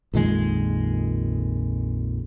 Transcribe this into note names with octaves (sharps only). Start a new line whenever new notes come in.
A#1 F2 D#3 G#3